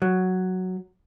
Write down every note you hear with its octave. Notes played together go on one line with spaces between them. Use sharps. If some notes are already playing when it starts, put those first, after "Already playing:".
F#3